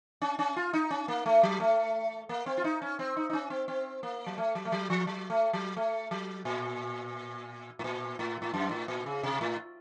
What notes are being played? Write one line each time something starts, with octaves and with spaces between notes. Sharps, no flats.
C#4
C#4
F4
D#4
C#4
A#3
A3
F#3
A3
A#3
C4
F4
D#4
C#4
C4
D#4
D#4
C#4
C4
C4
A#3
F#3
A3
F#3
A3
F#3
F3
F#3
A3
F#3
A3
F#3
A#2
A2
A#2
A2
A2
F#2
A2
A#2
C#3
C3
A2